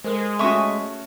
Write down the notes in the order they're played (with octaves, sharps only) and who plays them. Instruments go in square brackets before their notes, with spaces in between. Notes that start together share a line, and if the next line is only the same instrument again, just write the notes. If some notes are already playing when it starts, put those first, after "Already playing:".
[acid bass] G#3 [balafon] A4 A#4 C5
[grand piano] A3 C#4 F#4 [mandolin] E5 C#6 D#6